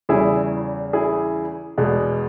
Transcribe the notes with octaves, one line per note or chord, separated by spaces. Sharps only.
E2 C#3 G3 E4 G#4
E4 G#4
E2 B2 G#3